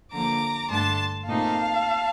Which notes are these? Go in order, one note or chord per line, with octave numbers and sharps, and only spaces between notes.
D3 F3 A#3 A#5 D6
G2 D3 A3 D4 A5 C6
A#2 A3 C4 D#4 F5 A5